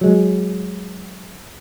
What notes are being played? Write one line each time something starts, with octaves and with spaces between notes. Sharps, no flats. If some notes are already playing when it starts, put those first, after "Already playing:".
F#3 G#3